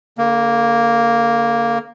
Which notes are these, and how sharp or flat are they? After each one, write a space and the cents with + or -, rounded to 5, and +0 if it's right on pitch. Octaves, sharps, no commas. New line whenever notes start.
D3 -40 A#3 +0